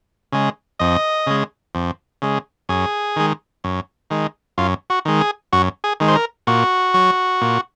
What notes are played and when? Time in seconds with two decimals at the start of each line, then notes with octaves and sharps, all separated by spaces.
0.32 C#3 G#3
0.79 F2 D#5
1.27 C#3 G#3
1.75 F2
2.22 C#3 G#3
2.69 F#2 G#4
3.16 D#3 G#3
3.64 F#2
4.10 D#3 G#3
4.58 F#2 F4
4.90 F#4
5.05 D#3 G#3
5.21 G#4
5.53 F#2 F#4
5.84 G#4
6.00 D#3 G#3
6.08 C5
6.16 A#4
6.47 A#2 F#4
6.94 F#3
7.42 A#2